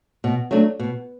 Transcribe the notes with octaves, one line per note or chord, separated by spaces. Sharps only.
B2
F#3 A3 D4
B2